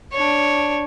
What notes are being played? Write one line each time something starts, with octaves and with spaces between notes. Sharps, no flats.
D4 C#5